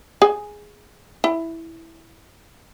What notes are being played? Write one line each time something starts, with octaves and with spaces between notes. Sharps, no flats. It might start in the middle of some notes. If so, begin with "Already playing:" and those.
G#4 G#5
E4